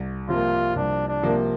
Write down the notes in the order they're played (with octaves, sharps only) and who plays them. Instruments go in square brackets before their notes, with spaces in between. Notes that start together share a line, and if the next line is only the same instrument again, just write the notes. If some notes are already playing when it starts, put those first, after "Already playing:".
Already playing: [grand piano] C2
[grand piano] C3 F3 A#3 [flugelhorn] F4
[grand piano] C2 [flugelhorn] D4
[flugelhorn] D4
[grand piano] C3 F3 A#3